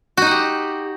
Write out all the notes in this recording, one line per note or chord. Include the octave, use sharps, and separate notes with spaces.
D#4 F#4 G4 F#5